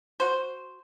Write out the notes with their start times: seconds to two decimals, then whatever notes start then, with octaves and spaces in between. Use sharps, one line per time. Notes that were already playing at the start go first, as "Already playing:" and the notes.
0.20 F#4 C5